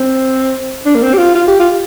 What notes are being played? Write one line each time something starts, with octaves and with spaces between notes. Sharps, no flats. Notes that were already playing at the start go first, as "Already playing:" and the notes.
Already playing: C4
D4
A#3
C4
G4
F4
F4
G4
F4